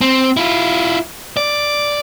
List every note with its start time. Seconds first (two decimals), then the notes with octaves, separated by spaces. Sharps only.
0.01 C4
0.37 E4 F4
1.37 D5